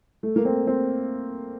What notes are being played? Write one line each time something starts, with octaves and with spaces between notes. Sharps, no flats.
A3
A#3
C4
C4